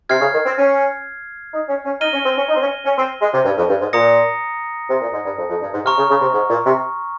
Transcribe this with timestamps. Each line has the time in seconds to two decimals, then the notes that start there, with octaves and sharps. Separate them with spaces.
0.09 C3 F6 G#6 C7
0.21 C#3
0.33 D#3
0.45 C4
0.57 C#4
1.53 D#4
1.69 C#4
1.85 C#4
2.01 D#4 F6 A#6 D#7 G7
2.13 C#4
2.25 C4
2.37 C#4
2.49 D#4
2.56 C4
2.62 C#4
2.85 C#4
2.97 C4
3.21 G#3
3.33 C3
3.45 G2
3.58 F2
3.69 G2
3.81 G#2
3.93 A#2 A#5 D#6 A#6 C#7
4.89 C3
5.01 A#2
5.13 G#2
5.25 G2
5.38 F2
5.49 F2
5.61 G2
5.74 G#2
5.85 C3 A#5 C#6 F6
5.97 C#3
6.09 C#3
6.21 C3
6.33 G#2
6.50 A#2
6.66 C3